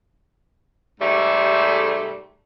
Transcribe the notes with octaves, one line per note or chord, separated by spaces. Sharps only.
G#2 C3 G3 A3